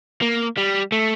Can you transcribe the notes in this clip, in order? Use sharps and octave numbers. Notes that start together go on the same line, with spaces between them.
A#3
G3
A3